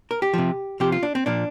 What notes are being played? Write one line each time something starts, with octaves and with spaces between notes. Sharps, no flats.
A#4
G4
C3 F3
C3 F3 G4
F4
D4
C4
A#2 F3 D4